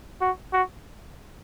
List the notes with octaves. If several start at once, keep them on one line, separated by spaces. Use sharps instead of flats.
F#4
F#4